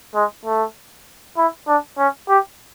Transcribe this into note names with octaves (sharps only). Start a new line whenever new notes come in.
G#3
A3
E4
D4
C#4
G4